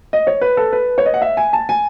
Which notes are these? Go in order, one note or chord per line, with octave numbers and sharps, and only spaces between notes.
D#5
C#5
B4
A4
B4
C#5
D#5
F#5
E5
G#5
A5
G#5